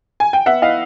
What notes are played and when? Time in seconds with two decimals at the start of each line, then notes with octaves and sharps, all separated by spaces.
0.20 G#5
0.33 G5
0.46 B3 E5 F#5
0.62 E4 D#5 F5